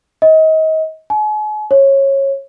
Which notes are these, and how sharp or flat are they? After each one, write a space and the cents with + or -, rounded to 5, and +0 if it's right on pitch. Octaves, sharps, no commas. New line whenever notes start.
D#5 +30
G#5 +40
C#5 -20